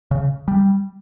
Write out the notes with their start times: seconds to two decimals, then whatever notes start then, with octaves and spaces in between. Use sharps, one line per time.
0.11 C#3
0.48 G3